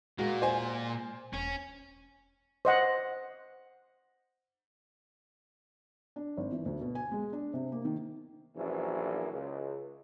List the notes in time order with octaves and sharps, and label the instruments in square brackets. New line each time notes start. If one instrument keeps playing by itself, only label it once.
[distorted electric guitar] A#2 A#3 [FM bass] G#3 [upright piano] F#4
[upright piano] C5 G#5
[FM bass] E1 [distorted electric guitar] C#4
[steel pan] C5 D#5 F#5
[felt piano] D4
G#1
E3
D2
B2
G#5
G#3
D4
C3
A#3
D#3
[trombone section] A#1 F#2 E3
C#2